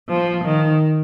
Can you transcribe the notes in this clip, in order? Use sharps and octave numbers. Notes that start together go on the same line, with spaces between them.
F3
D#3